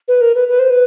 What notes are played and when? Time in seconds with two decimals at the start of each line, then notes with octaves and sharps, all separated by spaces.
0.08 B4
0.21 A#4
0.35 B4
0.48 B4
0.59 C5
0.70 B4